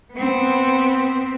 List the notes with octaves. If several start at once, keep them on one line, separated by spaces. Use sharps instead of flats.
B3 C4